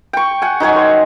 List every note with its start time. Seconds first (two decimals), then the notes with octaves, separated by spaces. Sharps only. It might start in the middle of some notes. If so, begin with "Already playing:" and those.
0.13 G5 C#6
0.42 F#5 G#5
0.60 D#3 F#3 C#5 G#5
0.76 C5